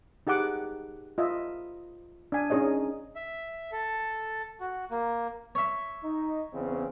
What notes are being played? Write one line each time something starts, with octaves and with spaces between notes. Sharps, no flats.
D#4 G4 G#4 F#5 D6
F4 D#5 E5
D4 G#5
C#4 D#4 G#4 C#5 D#5
E5
A4
F#4
A#3
C#5 E5
D#4
E2 C#3 C4